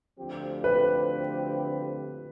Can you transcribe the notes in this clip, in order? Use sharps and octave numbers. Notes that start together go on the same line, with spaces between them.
D2 D3 F3 C4 G4
B4